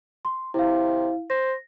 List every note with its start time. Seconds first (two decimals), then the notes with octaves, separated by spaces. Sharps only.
0.25 C6
0.54 C3 E4 F5
1.30 C5 A#6